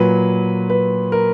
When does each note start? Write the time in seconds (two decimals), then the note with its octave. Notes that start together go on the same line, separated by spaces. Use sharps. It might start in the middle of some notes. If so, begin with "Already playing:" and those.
Already playing: A#2 F#3 B4
0.70 B4
1.12 A#4